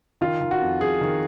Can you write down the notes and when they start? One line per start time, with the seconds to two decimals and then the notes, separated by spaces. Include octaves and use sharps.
0.21 D#3 F4
0.41 D#3
0.51 F#4
0.61 F2
0.81 F2 G#4
1.01 D#3